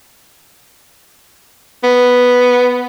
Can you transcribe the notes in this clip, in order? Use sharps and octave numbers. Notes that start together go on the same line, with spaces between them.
B3